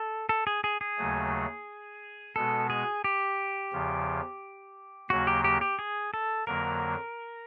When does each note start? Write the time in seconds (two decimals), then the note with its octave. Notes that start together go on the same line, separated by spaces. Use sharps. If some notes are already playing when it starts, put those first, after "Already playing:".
Already playing: A4
0.29 A4
0.47 G#4
0.64 G#4
0.81 G#4
0.98 D#2 C#3 F#3 A3
2.36 B2 G#3 B3 A4
2.70 G#4
3.04 G4
3.72 E2 C#3 F3
5.10 D#2 C#3 F#3 A#3 F#4
5.27 G4
5.44 G4
5.61 G4
5.79 G#4
6.14 A4
6.47 F2 D3 F#3 A#3 A#4